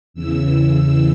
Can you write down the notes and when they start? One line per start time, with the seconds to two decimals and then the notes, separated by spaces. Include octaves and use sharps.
0.14 E2 C#3 E3 E6
0.59 E6